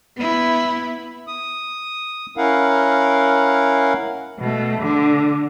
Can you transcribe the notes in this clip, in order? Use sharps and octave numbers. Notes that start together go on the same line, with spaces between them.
B3 E4
D#6
C#4 E4 A#4 F5 F#5
B2 A3
D3